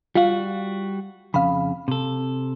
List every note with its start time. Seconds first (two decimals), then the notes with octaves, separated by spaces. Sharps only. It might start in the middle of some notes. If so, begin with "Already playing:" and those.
0.15 G3 F4 F#4 F5
1.34 F2 C#3 F5 B5
1.88 C3 A4